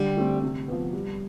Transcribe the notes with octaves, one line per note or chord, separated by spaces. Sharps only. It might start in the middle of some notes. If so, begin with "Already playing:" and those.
Already playing: D3 G3
A3 C4
C3
F3 B3
G3